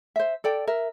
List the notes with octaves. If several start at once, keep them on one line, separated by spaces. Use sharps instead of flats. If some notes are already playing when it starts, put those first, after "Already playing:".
C5 E5
A4 D5 G5
A#4 E5